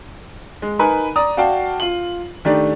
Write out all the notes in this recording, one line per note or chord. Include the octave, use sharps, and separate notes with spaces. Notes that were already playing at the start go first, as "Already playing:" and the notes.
G#3
D#4 A#4 B4 G#5 B5
D5 A#5 D#6
F#4 D5 F5 G5 A5
F4 F#7
D#3 A3 D4 G4 D5